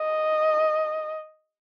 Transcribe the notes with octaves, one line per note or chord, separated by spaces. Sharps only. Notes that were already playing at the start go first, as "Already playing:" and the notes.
Already playing: D#5